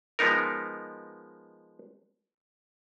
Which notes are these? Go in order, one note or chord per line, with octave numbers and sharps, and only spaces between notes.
F3 G#3 B3 D#4 A#4